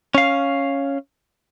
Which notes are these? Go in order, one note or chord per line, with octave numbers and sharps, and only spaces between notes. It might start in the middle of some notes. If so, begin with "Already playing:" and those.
C#4 F5